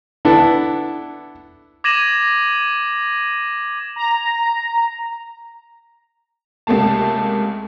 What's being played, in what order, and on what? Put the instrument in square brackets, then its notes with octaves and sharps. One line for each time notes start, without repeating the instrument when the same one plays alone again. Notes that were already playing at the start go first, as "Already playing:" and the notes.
[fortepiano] B3 D4 E4 A4
[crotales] D6 G#6 A#6 D#7 E7 F#7
[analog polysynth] A#5
[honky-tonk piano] C#2 C3 A3 A#3 A5